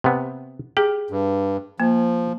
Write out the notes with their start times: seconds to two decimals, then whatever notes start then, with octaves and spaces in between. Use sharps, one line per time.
0.04 C3 B3
0.77 G4 G#4
1.10 G2
1.80 F3 A#3